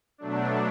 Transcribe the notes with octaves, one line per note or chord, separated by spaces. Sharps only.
B2 F#3 A3 D4